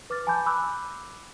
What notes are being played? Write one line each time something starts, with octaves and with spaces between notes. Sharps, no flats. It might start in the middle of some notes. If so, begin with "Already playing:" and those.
B4 D6 F6 A6
G#5 A5 B5 D6 G6
B5 D6 E6 F#6